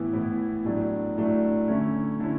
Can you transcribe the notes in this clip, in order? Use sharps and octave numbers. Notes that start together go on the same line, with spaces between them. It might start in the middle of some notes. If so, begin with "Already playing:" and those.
Already playing: A2 E3 B3 E4
A2 E3 B3 E4
A2 F#3 A3 D4
A2 F#3 A3 D4
D3 A3 C#4 E4
D3 A3 C#4 E4